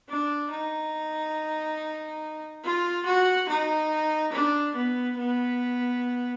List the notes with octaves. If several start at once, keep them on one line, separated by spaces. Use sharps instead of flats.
D4
D#4
F4
F#4
D#4
D4
B3
B3